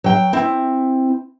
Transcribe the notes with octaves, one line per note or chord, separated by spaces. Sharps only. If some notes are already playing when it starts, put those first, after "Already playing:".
F#3 G5
C4 E4